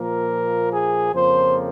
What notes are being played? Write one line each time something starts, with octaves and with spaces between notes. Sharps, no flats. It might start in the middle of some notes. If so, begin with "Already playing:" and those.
Already playing: A#2 F3 A#3 A#4
G#4
F2 C#3 F3 A#3 C5